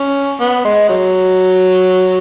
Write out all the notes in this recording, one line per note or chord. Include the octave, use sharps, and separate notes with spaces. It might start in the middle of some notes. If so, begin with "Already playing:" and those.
Already playing: C#4
B3
G#3
F#3